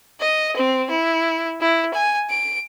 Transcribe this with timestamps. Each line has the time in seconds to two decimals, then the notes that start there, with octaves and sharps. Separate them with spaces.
0.20 D#5
0.56 C4
0.90 E4
1.61 E4
1.94 G#5
2.29 D7